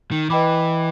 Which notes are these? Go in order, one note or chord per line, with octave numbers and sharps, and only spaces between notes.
D#3
E3 B4 D#5 G5 B5 D6